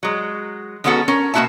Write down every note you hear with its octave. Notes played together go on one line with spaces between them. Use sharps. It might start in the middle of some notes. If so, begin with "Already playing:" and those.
F#3 G#3
D#3 G#3 B3 C#4 F#4 A4
C#4 A#4
B2 A#3 E4 F#4 E5 A5